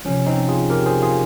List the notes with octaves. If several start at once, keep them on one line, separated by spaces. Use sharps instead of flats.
C3 F3 C#4
C4 D#4
F4 G#4
G4 A#4
G#4 C5
F4 G#4